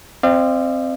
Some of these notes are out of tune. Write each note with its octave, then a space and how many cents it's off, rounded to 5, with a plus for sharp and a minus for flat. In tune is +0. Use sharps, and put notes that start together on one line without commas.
C4 +0 D5 +45 F5 -30